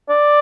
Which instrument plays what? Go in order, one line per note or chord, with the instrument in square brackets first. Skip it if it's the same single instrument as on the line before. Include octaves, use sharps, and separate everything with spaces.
[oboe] D5